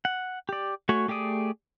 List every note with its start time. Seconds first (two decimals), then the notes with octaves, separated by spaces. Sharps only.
0.05 F#5
0.49 G4 D5
0.89 A3 F#4 C#5 G#5
1.08 A3 G4 G#4 D5 D#6